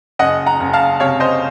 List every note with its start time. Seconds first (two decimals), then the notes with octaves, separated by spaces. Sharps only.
0.19 F#1 D#5 F#5
0.46 F#5 A#5
0.60 F#1
0.73 F5 A5
1.00 C3 C#5 F5
1.20 C5 D#5